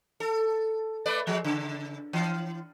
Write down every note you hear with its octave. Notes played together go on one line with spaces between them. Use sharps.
A4
A3 B4 D5
F3 G#3
C#3
E3